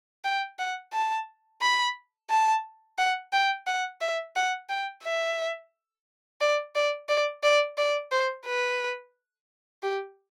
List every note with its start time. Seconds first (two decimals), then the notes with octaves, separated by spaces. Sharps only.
0.24 G5
0.59 F#5
0.93 A5
1.62 B5
2.30 A5
2.98 F#5
3.33 G5
3.67 F#5
4.01 E5
4.36 F#5
4.69 G5
5.04 E5
6.41 D5
6.75 D5
7.09 D5
7.43 D5
7.78 D5
8.12 C5
8.46 B4
9.83 G4